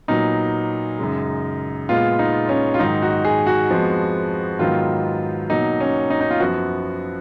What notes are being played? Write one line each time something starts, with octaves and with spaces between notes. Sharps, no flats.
A#2 F#3 B3 D#4
F#2 C#3 G#3
A#2 G#3 B3 F4
D#4
C#4
F4
G#2 D#3 F#3 D#4
F#4
G#4
F#4
F2 F3 G#3 B3
G#2 D#3 F#3 B3 F4
B2 F#3 A#3 D#4
C#4
D#4
D#4
F4
F#2 F3 B3 F#4